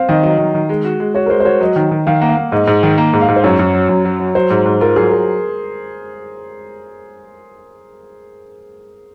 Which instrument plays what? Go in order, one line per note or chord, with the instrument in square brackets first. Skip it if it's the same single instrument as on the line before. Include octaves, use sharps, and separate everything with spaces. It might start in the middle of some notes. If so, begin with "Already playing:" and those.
Already playing: [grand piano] C4 [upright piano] F5
[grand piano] D#3 [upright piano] D#5
[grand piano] F#3 [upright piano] D#5
[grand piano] D#3
D#3
G#3
F#4
G#3
[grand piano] F#4 [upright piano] C#5
[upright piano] A#4
[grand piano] G#3 [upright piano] C5
[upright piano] C5
[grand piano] F#4 [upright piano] C#5
[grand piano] F#3 [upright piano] D#5
[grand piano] D#3
D#3
[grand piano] D#3 [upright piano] F5
[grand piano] A#3 [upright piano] F#5
[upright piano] F5
[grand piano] A#3
[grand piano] G#2 [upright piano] D#5
[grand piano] G#2
D#3
A#3
G#2
[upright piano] F5
[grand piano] G#2
[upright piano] C5
[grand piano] F#2 [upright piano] C#5
[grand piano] F#2
F#3
F#2
F#3
F#3
[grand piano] F#3 [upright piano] C5
[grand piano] G#2
G#2
[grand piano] F4 [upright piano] A#4
[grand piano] F#3 [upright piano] G#4
[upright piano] A#4